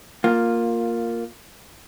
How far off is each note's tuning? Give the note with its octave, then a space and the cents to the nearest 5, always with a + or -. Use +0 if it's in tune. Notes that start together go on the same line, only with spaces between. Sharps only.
A#3 -5 F4 +10